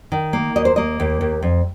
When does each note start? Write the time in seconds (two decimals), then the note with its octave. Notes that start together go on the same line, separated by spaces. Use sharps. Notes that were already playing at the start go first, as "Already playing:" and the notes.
0.12 D#3
0.33 A#3
0.56 D#2 D#5
0.65 C5
0.76 A#3 D#5
1.00 D#2
1.21 D#2
1.42 F2